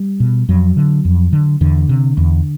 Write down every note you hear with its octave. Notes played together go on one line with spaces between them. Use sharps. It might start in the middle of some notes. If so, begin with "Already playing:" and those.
Already playing: G3
B2
F2 F#3
D3
F2
D3
E2 D3
C3
E2